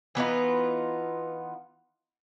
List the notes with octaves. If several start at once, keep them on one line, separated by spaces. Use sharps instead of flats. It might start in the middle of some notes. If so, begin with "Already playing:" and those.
E3 B3 D#4 F4